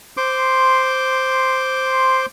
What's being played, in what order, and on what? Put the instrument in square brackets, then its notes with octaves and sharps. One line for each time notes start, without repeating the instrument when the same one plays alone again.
[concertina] C5 C6 D6